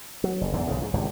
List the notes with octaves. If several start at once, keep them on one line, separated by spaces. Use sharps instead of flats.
F#3
F#1
E2 G#2 D3
B1 G#2 C#3
G#2
G#1 C#2 G2